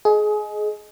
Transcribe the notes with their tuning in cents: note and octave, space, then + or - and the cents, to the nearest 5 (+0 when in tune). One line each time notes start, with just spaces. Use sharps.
G#4 +25 D#5 +0